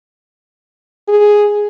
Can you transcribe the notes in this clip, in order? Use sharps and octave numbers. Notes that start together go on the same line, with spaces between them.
G#4